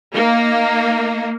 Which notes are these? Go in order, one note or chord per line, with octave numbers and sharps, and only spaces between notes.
A#3 D#4